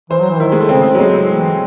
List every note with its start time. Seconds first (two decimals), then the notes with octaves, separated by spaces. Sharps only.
0.10 E3 C5
0.21 F#3
0.31 E3
0.40 D#3 E4
0.52 G#3
0.61 A3
0.69 C#3 C4
0.95 F#3
1.00 G#3
1.30 E3